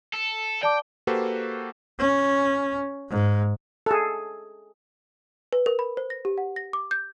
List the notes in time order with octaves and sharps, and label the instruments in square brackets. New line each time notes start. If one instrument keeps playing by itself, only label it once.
[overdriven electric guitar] A4
[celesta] D5 A5 D6 [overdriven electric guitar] G5
[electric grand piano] A#3 F#4 G4 A4 B4 C5
[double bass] C#4
G#2
[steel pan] G#4 A4
[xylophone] B4
A#4
B5
C5
A#6
G4
F#5
A#6
D6
G6